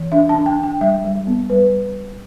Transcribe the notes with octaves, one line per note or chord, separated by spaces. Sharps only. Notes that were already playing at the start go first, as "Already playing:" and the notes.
Already playing: E3
D4 E5
A5
D4
G5
D4 G5
G3 E5
G3
B3
G3 B4